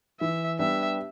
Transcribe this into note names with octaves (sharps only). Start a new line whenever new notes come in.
E3 E5
G3 B3 D4 G4 E5